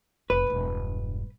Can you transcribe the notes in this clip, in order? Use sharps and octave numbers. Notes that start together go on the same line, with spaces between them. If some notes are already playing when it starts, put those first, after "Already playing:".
F1 B4
E1 G2